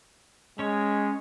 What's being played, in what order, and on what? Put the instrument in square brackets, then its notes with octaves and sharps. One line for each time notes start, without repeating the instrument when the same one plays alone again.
[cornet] G#3 [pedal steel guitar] C#4 C#5